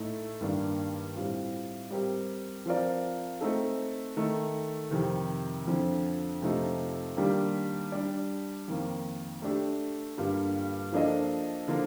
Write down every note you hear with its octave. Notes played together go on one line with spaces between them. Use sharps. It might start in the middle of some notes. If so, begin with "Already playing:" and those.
Already playing: A2 A3 D#4
G2 D#3 A#3 D4
A2 G3 C4 F4
G3 C4 G4 A#4
F3 C4 F4 A#4 D5
A3 C4 D#4 A4
D#3 A3 D#4
F2 C3 D#3
F2 D3 F3
F2 C3 F3 A3 D#4
D#3 G3 A#3 D4 G4
G3 D4 G4 D5
F2 D#3 A#3
A3 D4 G4
G2 D3 G3 A#3 F4
F3 A#3 D4 A4 D#5
D3 F3 A#3